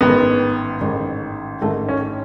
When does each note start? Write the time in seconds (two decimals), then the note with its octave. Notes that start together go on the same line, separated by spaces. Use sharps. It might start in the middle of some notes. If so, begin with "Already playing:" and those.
0.01 A1 G#2 D#3 B3
0.81 A1 G#2 D#3
1.61 A1 G#2 D#3 A3
1.89 C#4